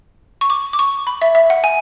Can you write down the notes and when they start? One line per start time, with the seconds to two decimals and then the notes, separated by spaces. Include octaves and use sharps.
0.41 C#6
0.50 D6
0.73 D6
0.79 C#6
1.07 B5
1.22 E5
1.35 E5
1.50 F#5
1.64 G#5